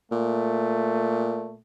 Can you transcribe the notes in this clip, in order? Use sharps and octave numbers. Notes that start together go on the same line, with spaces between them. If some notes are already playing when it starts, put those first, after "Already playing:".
A#2 A3